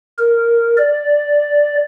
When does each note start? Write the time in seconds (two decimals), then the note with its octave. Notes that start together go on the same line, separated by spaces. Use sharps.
0.19 A#4
0.77 D5